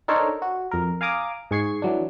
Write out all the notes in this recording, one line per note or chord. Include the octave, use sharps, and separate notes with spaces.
D4 D#4 A4 A#4 C5 C#5
F#4
F2 A#4
F5 G#5 A#5 D6 D#6
G#2 G#4 C#6 G#6 C7
E3 F#3 D4